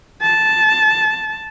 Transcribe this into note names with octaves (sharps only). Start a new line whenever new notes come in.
A5